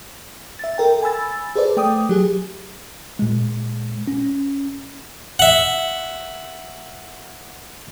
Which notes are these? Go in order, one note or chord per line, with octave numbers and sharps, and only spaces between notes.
E5 A6
A4 A#4 G5
G#5 B5 E6 A6
G#4 A4 B4 C5 D5
A3 G5 D6 D#6
F#3 G4 G#4
A#2 G#3
C#4
E5 F#5